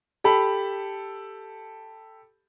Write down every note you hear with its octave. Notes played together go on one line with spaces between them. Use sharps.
G4 A4 B5